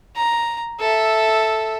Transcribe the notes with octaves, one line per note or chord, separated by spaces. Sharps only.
A#5
A4 E5